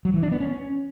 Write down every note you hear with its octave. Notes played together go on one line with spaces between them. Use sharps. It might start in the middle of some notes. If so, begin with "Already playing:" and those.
F#3
E3
D4
B3
C#4